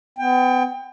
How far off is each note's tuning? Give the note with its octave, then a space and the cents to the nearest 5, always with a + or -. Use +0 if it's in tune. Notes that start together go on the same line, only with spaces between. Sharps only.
B3 +40 G5 +25